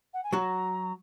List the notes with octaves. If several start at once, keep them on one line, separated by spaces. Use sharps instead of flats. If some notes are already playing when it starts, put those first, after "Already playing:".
F#5
G#5
F#3 F#4 A#5